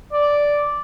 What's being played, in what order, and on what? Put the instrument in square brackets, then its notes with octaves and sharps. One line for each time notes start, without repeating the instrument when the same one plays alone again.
[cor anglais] D5